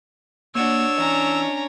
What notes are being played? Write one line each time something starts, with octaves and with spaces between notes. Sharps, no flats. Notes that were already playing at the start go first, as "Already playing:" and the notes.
A#3 D4 F#4 C#5 E6
E3 C#4 E4 D#5 A#5